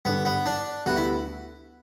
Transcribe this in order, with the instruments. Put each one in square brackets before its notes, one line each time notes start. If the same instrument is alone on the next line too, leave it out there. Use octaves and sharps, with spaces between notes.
[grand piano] G2 D3 G3 D4 G4 [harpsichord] B3
[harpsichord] B3
D4
[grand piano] D2 D3 G3 B3 [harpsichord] F#4
[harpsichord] E4